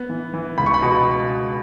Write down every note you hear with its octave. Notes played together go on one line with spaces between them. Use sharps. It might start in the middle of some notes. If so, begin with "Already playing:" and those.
Already playing: B3
E3
E3
C#2 B5
C#6
B5
B2